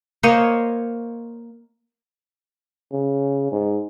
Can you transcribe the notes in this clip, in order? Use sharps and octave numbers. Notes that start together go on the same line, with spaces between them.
A#3 C5 C#5 D#5
C#3
G#2